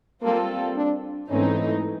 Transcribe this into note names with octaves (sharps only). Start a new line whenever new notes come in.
G3 A#3 C4 F4 A4
D4
G#2 E3 A3 C4 C#4 D#4